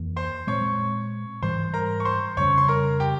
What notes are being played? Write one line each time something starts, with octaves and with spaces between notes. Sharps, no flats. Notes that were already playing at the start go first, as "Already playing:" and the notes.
Already playing: F2 E3 A#3
C5 C6
A#2 G#3 C4 C#5 C#6
G#2 E3 G3 C5 C6
A#4 A#5
C#6
C5 C6
F2 C#3 G3 C#4 C#5 C#6
C6
A#4 A#5
G4 G5